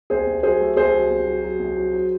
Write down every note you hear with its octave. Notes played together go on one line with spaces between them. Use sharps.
C2 G#4 C5
C2
F#3 G#4 C5
A3
C2 G#4 C5
F#3
C2
F#3
F#3
C2
F#3
F#3